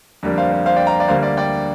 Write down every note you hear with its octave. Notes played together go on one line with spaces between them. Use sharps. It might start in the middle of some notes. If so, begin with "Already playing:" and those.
F2 D3 G3 A#3 D4
C5 F5
C5
C5 F5
D5 G5
F5 A#5
D5
D2 D3 G3 A#3 C5 F5
D5
D5 G5